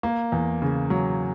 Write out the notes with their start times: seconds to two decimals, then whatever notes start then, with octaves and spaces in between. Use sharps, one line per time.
0.03 A#3
0.32 E2
0.62 C#3
0.90 F#3